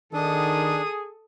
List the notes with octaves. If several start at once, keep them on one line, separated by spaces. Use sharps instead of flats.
D#3 D4 G#4 A4 D#6